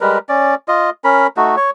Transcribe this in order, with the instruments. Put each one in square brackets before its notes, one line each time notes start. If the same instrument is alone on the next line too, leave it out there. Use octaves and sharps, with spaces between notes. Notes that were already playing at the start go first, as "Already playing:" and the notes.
[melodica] G3 G#3 A#4 B4
C#4 D5
F4 D#5
C#4 A#4 B5
A3 D#4 F#4
C#5